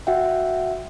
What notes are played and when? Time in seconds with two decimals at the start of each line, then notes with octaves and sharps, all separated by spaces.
0.07 F#4 E5 F#5 G5